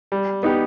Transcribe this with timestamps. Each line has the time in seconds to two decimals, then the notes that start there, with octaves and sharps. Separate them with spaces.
0.12 G3
0.43 B3 D#4 G4